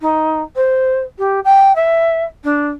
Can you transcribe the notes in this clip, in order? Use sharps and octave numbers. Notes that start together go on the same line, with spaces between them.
D#4
C5
G4
G5
E5
D4